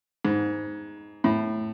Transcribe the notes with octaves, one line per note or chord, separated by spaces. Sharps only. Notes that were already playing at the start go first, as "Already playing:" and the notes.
G#2
A2